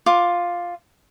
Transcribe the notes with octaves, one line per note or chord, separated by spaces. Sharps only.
F4 D6